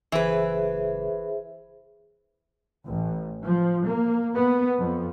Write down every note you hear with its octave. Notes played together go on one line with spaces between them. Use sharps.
F#1 E3 G#4 B4 C5 E5
A1
F3
A#3
B3
F2